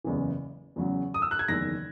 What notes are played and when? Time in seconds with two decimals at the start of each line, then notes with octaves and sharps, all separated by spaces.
0.04 F#1 E2 C#3 E3
0.76 E2 C#3 F#3
1.14 D#6
1.22 E6
1.31 F#6
1.39 G#6
1.48 F#1 E2 D#3 A#6